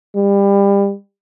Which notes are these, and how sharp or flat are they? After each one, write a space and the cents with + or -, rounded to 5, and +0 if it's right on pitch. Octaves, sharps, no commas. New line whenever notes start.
G3 +25